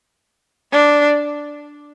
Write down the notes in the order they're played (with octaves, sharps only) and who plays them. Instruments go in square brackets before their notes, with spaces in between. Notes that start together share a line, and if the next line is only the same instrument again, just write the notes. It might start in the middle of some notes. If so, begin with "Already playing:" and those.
[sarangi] D4